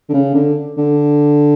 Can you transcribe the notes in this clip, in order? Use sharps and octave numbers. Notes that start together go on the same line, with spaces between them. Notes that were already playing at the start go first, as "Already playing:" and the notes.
D3
C#3
D3
D3